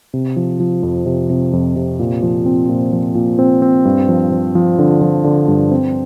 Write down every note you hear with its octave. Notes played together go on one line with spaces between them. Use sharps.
C3
F3
F3
F2
C3
C3
F2
C3
A#2
F3
C4
A#2
F3
A#2
C4
C4
G2
F3
F3
F3
D3
F3
D3
G2
C4